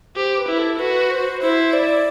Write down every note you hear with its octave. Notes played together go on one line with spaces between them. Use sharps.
G4 C5
B4
E4
A4
F#4 B4
C5
E4 C5
D5